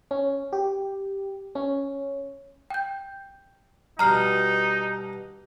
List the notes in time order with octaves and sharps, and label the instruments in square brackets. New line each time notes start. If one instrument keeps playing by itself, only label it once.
[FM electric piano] C#4
G4
C#4
[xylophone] G5 G6
[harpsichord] G2 B2 [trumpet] D#4 [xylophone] A#5 F6 C7